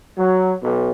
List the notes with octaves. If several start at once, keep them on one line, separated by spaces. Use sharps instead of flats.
F#3
B1